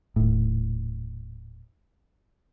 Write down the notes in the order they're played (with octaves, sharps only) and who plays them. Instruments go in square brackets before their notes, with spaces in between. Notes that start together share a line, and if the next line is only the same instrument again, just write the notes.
[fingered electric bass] D#1 A2